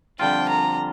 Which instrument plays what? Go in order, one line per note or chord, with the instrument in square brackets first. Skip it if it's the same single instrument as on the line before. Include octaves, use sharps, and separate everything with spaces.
[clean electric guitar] F2 D3 G3 D4 F4 [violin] G5
[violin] A#5